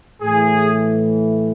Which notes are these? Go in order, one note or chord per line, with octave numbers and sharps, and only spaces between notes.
A2 E3 G#4